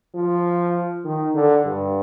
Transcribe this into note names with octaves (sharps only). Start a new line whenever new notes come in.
F3
D#3
D3
G2